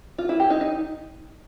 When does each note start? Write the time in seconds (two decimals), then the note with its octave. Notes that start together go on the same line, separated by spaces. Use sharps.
0.18 F4
0.29 E4
0.40 G4
0.50 D#4
0.61 D#4